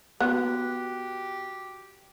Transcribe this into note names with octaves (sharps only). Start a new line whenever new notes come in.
B3 F#4 G4 F#6